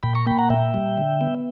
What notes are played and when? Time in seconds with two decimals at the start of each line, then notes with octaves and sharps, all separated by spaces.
0.03 A#2 G5 B5
0.15 A#5 C#6
0.26 A#3 G5 B5
0.38 F#5 A#5
0.50 A#2 E5 G5
0.74 G3
0.98 D3
1.21 B3